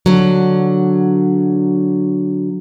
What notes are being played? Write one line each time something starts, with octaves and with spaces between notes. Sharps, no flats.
D3 F#3